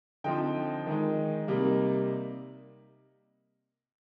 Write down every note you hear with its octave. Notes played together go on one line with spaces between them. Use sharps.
D3 F3 C4 D#4 D#5 G5
D#3 G#3 D#4
C3 G3 A#3 D#4